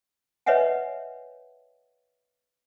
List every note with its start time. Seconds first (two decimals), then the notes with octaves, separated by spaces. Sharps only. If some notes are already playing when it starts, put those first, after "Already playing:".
0.46 B4 C#5 D#5 E5 F#5 G#5